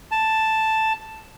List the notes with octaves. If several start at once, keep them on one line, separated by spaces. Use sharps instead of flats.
A5